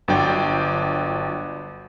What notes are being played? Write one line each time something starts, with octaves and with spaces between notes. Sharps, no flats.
G1 F#3 D4 D5 G5